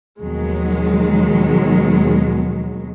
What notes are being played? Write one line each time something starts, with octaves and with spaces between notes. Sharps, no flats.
D#2 B2 D#3 F3 F#3 G#3